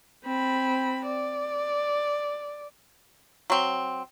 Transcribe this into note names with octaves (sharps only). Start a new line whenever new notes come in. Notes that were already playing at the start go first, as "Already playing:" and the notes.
C4 B5
D5
F#3 C4